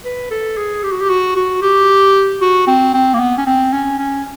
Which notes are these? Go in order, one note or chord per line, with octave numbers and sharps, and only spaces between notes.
B4
A4
G#4
G4
F#4
G4
F#4
F#4
G4
F#4
C4
C4
A#3
B3
C#4
C4
C#4
C#4